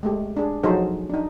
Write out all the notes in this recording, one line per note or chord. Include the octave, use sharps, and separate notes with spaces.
G#3 A3 G4
D4 G#4
F3 F#3 D#4 G#4 A4 C5
D4 D#4